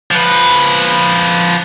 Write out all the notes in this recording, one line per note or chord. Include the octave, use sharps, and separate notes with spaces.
F3 B4